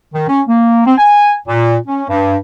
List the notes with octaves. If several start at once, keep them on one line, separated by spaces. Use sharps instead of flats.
D#3
C#4
A#3
C4
G#5
A#2
C#4
G2